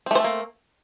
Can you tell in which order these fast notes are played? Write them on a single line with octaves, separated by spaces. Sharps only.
C4 A3 C5 A4 A#3